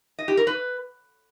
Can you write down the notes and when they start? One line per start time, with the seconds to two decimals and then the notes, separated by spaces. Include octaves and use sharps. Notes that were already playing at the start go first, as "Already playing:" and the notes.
0.19 D#5
0.28 G4
0.37 A#4
0.47 B4